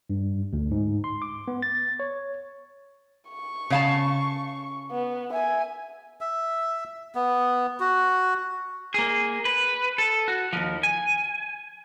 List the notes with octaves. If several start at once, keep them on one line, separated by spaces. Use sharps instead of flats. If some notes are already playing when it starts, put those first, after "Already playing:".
G2
D2
G#2
C6
D6
B3
A6
C#5
C#6
C#3 F5 A5
B3
E5 G#5
E5
B3
F#4
A#3 G#4
B4
A4
F#4
D#2 F3
G#5